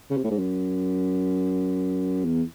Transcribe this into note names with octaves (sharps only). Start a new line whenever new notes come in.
C#3
C3
A2
G#2
F#2
E2